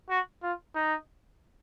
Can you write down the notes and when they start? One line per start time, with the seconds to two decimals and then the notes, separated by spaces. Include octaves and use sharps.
0.10 F#4
0.43 F4
0.75 D#4